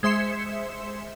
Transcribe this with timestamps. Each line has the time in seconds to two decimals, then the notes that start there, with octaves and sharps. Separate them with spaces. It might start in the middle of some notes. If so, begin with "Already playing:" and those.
0.03 G#3 C5 E5 C6 C#7 E7